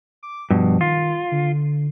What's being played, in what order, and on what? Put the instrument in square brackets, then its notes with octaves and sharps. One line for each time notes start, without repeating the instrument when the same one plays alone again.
[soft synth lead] D6
[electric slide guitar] G2 B2 [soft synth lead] F3
[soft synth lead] D#3 [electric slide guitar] F4
[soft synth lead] D3